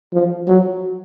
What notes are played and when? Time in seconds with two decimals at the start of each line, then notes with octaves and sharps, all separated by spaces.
0.13 F3
0.48 F#3